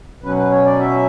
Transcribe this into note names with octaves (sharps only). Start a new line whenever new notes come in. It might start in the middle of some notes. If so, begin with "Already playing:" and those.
B2 F#3 C#4 B4
B4
C#5
D5
E5